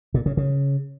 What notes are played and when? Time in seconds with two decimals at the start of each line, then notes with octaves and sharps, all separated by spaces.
0.14 A#2
0.26 C#3
0.37 C#3